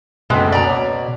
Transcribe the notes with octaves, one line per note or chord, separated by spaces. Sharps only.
F#1 D2 B2 G#3 B6
D5 A#5
C#5 D6